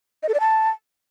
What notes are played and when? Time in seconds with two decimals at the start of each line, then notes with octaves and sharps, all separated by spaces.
0.23 D#5
0.29 A4
0.34 D5
0.40 A5